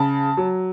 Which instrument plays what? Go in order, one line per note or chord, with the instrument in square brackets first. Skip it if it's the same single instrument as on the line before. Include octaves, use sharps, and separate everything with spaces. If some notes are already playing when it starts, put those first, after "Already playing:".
Already playing: [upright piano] C#3 A5
F#3